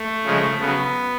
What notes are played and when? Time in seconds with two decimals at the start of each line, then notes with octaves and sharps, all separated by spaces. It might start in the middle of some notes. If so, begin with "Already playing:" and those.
Already playing: A3
0.25 C#3 F3 G#3
0.60 C#3 F#3 B3